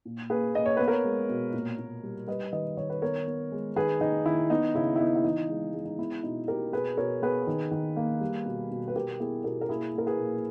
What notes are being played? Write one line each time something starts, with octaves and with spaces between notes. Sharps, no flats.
A#2
A#3 G#4 B4
A#3 D#5
C#5
B3 B4
A#4 C#5
G#3
B2
A#2
A#2
G3
G3 B4 D#5
D#3 B4 D#5
D#3 C#5
B4
B3 A#4 C#5
B3
G#3
D#3 G#4 B4
D#3 D#4
D#3 E4
B3 D#4
C#3 E4
E4
B3 D#4
E4
E3 D#4
G#3
G#3
D#4
B3 E4
B2 D#4
B2 G4 A#4
B2 G#4 B4
B2 A#4 C#5
B3 G#4 B4
D#3
D#3
A#3
G3
B2
B2
B4
B2 G4 A#4
B3 E4 G#4
B2 G4 A#4
A#4
A#3 E4 G#4
A#3 A#4
G#4 B4
A#2